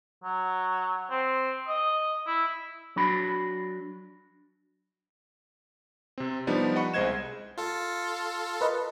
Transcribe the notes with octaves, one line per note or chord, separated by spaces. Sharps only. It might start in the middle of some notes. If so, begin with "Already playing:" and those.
F#3
C4
D#5
E4
F#3 D4 F#4 B5
C3 C4
F3 G3 B3 D4 D#4
D#5 F#5 B5 C#6 C#7
C2 G#3 C5 D#5 G#6 E7
F4 A4
A#4 B4 D#5